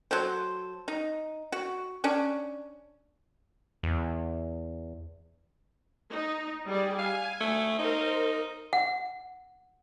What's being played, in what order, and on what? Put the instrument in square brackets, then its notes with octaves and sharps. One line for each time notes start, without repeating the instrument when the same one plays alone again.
[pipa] F#3 A4 C5
D#4
F#4
C#4 D4
[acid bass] E2
[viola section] D#4
G3 G#4 D5
[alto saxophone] F5 [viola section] G#5
[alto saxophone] A3
[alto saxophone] D#4 [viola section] A#4 C5
[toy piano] F#5